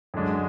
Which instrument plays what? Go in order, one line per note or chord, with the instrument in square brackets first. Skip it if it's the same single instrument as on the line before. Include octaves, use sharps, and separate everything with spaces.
[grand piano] F#2 D3 G#3 D4